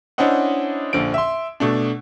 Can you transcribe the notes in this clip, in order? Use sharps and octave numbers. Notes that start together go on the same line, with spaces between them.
C#4 D4 E4 C5 D#5 F#5
A#1 D3 F3 D7
E5 C6
B2 A3 D4